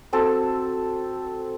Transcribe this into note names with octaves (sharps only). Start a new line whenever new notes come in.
C4 F#4 A4